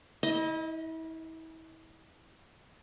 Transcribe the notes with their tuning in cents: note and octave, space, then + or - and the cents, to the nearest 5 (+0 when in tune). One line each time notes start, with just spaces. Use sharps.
E4 -35 D#5 +10